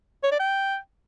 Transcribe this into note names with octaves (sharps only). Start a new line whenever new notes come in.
C#5
D5
G5